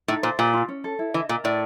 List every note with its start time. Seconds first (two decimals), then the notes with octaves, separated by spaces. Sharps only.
0.08 A2 D#4
0.23 A#2 C5
0.39 A#2 G4
0.53 F4
0.69 C#4
0.84 A4
0.99 E4
1.14 E3 D#5
1.29 A#2 A#4
1.44 A2 D5